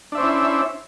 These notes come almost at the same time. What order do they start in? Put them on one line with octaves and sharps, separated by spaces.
D4 E5 C5 C#4 E4